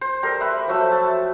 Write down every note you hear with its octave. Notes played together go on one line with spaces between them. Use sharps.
C5
G3 A4 A#4
B4 E5
F3 F#3 A3 E6
A5